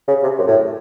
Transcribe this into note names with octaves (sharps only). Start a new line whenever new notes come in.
C#3
C3
F#2
A2